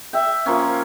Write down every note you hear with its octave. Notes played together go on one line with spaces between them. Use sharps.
E5 G5
F3 A#3 C#4